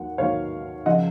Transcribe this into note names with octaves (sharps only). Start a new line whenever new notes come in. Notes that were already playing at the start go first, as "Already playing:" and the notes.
Already playing: D#2 D#3 F#3 F#5
D#2 D#3 F#3 C#5 F5
C#3 F3 D#5 F#5